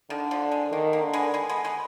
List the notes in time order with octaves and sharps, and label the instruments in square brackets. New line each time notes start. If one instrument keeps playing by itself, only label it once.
[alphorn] D3 [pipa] D#3
[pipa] F3
G#3
[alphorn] D#3 [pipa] A#3
[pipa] A#3
[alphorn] D3
[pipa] G#3 B3
G#3 B3
G#3 B3
G#3 B3